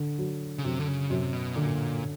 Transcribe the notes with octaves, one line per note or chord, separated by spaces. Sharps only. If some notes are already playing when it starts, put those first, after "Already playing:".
Already playing: D3
F#3
C#3
F#2 C3
D3
C#3
F#2 C3
B2
A#2 D3